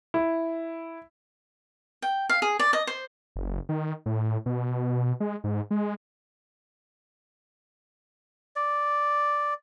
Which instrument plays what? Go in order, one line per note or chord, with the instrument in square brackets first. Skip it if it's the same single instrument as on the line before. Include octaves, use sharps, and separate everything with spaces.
[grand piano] E4
[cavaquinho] G5
F5
G#4
D5
D#5
C5
[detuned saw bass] F#1
D#3
A2
B2
G#3
G#2
G#3
[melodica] D5